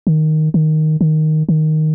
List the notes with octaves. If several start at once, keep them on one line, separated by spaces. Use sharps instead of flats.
D#3
D#3
D#3
D#3